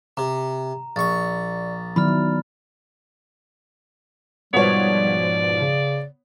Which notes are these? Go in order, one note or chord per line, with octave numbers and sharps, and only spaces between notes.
C3 A#5
A#1 D5 C#6 A6
D#3 F#3 B3 E4 D5 B5 F6
G#2 B2 F3 G3 B3 C#5 D5
C#3